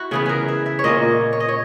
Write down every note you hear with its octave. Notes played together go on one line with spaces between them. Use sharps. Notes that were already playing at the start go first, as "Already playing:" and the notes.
Already playing: E4 F#4
C#3 E3 B3 G#4
G#4 A#4
E5
E5
C#5
A#2 A#3 C#4 D#5
C#5
D#5
C#5